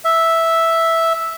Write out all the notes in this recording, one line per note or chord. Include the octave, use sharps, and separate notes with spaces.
E5